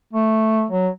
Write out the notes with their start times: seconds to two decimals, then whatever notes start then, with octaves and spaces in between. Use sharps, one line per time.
0.13 A3
0.71 F#3